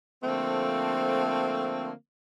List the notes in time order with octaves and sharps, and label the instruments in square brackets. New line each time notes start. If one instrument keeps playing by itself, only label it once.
[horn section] D3 F3 A3 A#3 C4